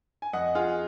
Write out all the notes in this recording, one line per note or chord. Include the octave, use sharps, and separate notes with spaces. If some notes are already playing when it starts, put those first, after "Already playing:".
G#5
F2 D#5 F#5
F4 G#4